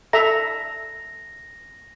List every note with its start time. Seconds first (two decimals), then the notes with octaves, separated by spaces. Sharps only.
0.13 A4 E5 A#5 A#6